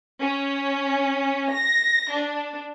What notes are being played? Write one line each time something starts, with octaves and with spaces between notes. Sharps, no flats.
C#4
A#6
D4